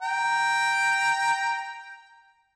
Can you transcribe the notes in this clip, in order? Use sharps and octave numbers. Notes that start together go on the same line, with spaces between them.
G5 A#5